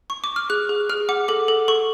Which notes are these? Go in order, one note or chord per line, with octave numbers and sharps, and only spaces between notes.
C#6
D6
F6
G#4 F#6
G#4
G#4 F6
F#5 D6
A4 D6
A4
A4 C#6